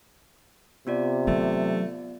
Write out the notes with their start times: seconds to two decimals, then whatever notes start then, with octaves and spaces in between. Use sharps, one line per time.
0.87 C3 B3 F4 D5
1.27 E3 F#3 A3